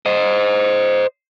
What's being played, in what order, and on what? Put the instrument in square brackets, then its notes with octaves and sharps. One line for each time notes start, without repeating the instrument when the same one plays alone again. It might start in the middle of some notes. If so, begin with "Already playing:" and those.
[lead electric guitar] C5 D#5